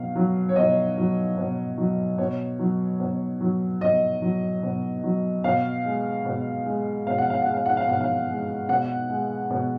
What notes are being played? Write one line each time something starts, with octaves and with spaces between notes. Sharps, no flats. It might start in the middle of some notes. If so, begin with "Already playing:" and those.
Already playing: B2 F#3 F5
F#3
C#5
B2 D#5
F#3
B2
F#3
B2 C#5
F#3
B2
F#3
B2 D#5
F#3
B2
F#3
B2 F5
G#3
B2
G#3
B2 F5
F#5
F5
G#3 F#5
F5
F#5
F5
B2 F#5
F5
G#3
B2 F#5
G#3
B2